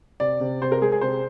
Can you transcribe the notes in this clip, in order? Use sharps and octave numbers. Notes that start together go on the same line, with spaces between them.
C3 D5
C3
C3 C5
A#4
G#3 G#4
G#4
C3 C5